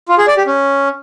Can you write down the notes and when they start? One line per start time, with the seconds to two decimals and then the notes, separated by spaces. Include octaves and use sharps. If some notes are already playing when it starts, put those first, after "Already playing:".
0.09 F4
0.18 G#4
0.28 D5
0.37 G4
0.47 C#4